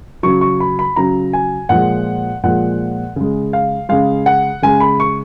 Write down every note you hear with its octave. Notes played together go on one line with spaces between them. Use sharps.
C#3 F#3 C#6
C#6
B5
B5
C#3 F#3 A#5
G#5
A#2 F3 G#3 F#5
A#2 F3 G#3 F#5
C#3 G#3
F5
C#3 G#3 F5
F#5
C#3 G#3 G#5
B5
C#6